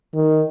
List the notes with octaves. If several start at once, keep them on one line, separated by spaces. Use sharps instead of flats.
D#3